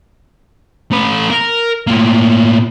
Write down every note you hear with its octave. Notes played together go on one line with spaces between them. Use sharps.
A3 B4
A#4
A2 A#3